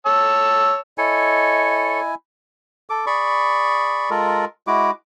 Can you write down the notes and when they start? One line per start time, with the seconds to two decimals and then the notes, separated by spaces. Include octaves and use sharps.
0.06 C#5 A5 E6
0.98 E4 A4 C#5 D#5 G#5
2.90 A4 D6
3.07 G#4 D5 B5 C#6
4.10 G#3 F4 A4 A#4
4.67 G#3 E4 F#4 D6